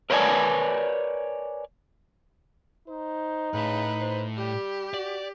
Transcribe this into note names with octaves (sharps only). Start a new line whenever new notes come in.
A#4 B4 C#5 D5 G#5 A5
D#4 C5
A2 C#3 B4
C5
G3 G4
F#4 D5